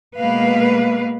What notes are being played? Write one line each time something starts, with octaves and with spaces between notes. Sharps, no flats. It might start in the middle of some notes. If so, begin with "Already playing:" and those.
B2 G#3 A#3 B4 F5